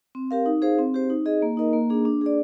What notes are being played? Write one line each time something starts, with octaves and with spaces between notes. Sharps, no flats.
C4
G4 A#4 F5
D#4
G#4 C5 F5
C4
G4 C5
D#4
G#4 D#5
A#3
D#4 A#4 D#5
A#3
D4 G#4
D4
G#4 D5